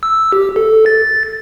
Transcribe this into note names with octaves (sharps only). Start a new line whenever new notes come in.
E6
G4
A4
A6